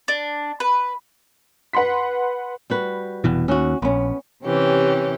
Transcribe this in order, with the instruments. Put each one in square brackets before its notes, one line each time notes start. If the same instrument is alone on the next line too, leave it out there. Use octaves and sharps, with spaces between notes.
[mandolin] D4
B4
[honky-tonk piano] B4 F#5 B5 C6 B6
[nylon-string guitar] G3 F#4 B4
[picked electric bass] F1 B2 E3
[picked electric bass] D#2 [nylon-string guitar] C#4 F#4
[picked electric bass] A#1 [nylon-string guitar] B3 C#4
[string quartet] C3 E3 C#4 G4